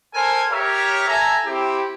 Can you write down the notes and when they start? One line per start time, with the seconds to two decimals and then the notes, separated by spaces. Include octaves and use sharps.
0.14 A4 A#4 C5 G#5
0.50 G4 A#4 C#5 E5 A#5
1.07 A4 E5 G#5 A#5
1.44 C4 E4 G4